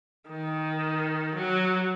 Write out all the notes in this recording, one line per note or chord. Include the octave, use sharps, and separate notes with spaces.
D#3
F#3